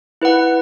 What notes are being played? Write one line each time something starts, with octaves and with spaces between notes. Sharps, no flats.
E4 B4 F#5